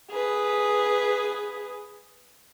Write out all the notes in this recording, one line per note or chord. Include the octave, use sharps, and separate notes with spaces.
G#4 B4